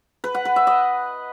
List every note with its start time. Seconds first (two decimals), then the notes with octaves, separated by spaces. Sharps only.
0.24 B4
0.35 F#5
0.45 B4
0.56 E5
0.67 D#5